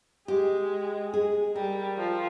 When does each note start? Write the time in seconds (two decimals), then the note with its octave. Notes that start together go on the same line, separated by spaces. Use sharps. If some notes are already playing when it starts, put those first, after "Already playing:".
0.28 G#3 G4
1.14 G#4
1.56 G3 A#4
1.98 F3